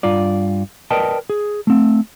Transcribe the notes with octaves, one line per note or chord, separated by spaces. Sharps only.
G2 F4 D5
A#4 B4 D5 D#5 G5 A5
G#4
A3 C4